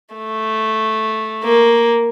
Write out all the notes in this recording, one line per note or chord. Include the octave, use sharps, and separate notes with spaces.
A3
A#3